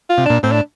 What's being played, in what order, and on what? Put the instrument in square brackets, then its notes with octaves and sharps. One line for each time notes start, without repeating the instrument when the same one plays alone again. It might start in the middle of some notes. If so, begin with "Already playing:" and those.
[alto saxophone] F4
[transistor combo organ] C3
[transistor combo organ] A#2 [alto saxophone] D4
[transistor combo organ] A2 [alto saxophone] C4
[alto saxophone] D4